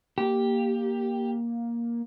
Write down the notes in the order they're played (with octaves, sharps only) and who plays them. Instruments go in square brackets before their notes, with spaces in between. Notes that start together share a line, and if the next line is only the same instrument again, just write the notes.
[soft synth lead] A#3 [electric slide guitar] G4